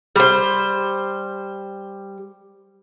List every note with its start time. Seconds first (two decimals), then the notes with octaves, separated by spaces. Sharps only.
0.16 G3 C5